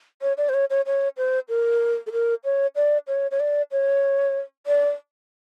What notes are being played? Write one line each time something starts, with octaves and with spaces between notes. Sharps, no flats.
C#5
D5
C5
C#5
C#5
C#5
C5
A#4
A4
A#4
C#5
D5
C#5
C#5
D5
C#5
D5